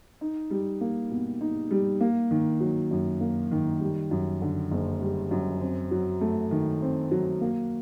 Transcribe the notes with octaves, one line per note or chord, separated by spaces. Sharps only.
D#4
G3
A#3
B2
D#4
G3
A#3
D#3
F#3
F#2
A#3
D#3
G3
F#2
D3
F#1
G3
F#2
C4
F#3
A3
D#3
C4
F#3
A#3